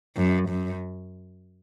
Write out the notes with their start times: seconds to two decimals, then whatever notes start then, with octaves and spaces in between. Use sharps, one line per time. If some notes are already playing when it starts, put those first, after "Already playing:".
0.17 F#2
0.49 F#2